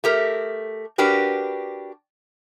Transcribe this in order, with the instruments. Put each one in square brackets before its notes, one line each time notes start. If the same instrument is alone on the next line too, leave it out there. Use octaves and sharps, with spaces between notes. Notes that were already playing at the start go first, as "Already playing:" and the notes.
[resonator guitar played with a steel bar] A3 G4 A#4
D4 F#4 G4 A#4 B4